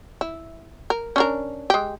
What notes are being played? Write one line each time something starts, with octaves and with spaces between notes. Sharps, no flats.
E4
A#4
C#4 D4 A#4
G#3 G4